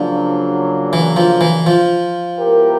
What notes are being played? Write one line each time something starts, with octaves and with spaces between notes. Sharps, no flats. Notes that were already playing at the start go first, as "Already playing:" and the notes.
Already playing: C#3 F3 F#3 A#3 D4
E3
F3
E3
F3
G#3 B3 E4 G4 A#4